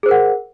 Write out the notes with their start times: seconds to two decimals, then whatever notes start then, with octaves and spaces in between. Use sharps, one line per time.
0.03 G#4
0.06 C5
0.09 A#4
0.11 F#5